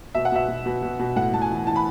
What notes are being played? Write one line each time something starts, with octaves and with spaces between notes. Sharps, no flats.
B2 E5
F#5
B2 E5
B2
B2
B2
B2
A2 F#5
A2 A5
G#5
E3
E3 A5
B5